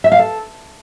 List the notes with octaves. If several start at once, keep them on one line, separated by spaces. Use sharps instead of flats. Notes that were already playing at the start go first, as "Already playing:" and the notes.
E5
F5
A4